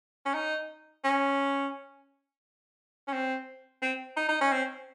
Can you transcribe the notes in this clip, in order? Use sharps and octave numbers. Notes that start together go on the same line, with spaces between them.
C#4
D#4
C#4
C#4
C4
C4
D#4
D#4
C#4
C4